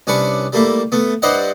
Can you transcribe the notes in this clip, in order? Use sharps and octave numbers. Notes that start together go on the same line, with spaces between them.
C2 C#4 D4 B4 C#6
G3 A3 A#3 E4
A3 B3
G2 E4 C5 D5 D#5 F#5